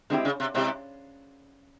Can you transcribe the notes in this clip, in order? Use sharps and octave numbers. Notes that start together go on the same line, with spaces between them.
D3 G#3 C4 E4 G4
C#3
C3
C3 G#3 C4 E4 G4